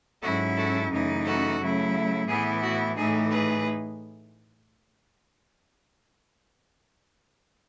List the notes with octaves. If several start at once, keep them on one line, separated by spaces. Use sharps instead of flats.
G#2 F#3 C#4 E4 F#4 A4
F#4 A4
F#2 C#3 E3 A3 D#4
F#4 A4
C#3 F#3 A3 E4
A2 E3 B3 E4 G#4
F#4
A2 E3 A3 D#4 G#4
G#4 B4